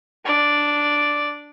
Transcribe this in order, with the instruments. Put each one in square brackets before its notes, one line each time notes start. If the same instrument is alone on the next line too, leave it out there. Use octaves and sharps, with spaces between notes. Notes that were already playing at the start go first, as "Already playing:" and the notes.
[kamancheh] D4 D5